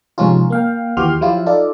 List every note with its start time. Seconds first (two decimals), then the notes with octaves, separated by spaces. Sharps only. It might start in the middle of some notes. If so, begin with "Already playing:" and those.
0.18 G#2 C3 F3 C#4 D#4 F4
0.50 A#3 F5 G5
0.97 D#2 E3 F#4 G4 C6 F6
1.21 F3 F#3 E4 F4 G4
1.46 D#4 F4 A4 D5